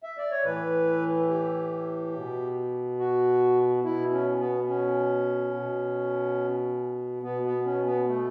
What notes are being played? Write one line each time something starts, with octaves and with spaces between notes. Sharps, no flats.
E5
D5
C#5
A2 E3 B4
G4
B2
F#4
B2 E4
C#4
B3
C#4
B2
B2 B3
B3
C#4
B3
A3